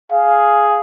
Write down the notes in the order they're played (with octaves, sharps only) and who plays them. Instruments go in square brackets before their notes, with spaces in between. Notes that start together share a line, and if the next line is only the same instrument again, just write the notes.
[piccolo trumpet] G#4 [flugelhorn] F5